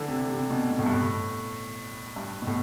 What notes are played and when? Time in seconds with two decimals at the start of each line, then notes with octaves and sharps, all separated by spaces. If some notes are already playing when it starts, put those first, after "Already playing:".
Already playing: D3 E3
0.08 C3
0.30 C3
0.50 B2
0.71 B2
0.79 A2
0.86 G2
0.94 A2
2.16 G2
2.42 B2
2.47 A2